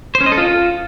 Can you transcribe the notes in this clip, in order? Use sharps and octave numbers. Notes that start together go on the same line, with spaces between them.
C5
C#4
D#5
A4
F4